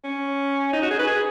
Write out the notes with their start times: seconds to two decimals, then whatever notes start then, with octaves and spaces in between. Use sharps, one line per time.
0.04 C#4
0.73 D#4
0.82 F#4
0.90 G#4
0.99 B4
1.07 G#4